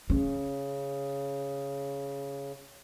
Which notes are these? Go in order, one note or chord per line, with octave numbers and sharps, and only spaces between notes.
C#3 C#4